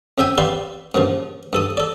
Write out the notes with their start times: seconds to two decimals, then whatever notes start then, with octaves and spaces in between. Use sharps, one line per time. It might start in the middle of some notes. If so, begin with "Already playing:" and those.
0.18 F2 C#3 E5 G5 G#5
0.38 G4 B4 D5 F5 C6
0.94 G2 A#2 C#3 F3
1.53 G2 A4 D#6
1.77 A4 D5